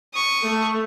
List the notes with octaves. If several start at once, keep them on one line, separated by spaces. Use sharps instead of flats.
C#6 D#6
A3